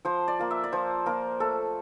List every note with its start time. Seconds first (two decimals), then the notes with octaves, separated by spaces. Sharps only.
0.05 F3 C5
0.28 D5
0.39 A#3 F4
0.51 E5
0.64 D5
0.72 F3 C5
1.06 A#3 F4 A#4
1.40 A3 A4